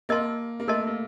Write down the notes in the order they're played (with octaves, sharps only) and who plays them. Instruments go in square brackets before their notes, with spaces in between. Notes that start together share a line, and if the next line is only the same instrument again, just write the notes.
[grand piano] A#3 [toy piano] A#4 D#5 A5 C6
[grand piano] A#3
[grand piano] A3 [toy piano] A#4 D#5 A5 C6
[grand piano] A#3